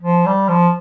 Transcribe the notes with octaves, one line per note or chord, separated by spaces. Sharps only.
F3
G3
F3